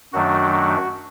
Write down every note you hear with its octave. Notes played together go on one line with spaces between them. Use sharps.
F#2 D#3 F#3 A3 D4 F#4
F#4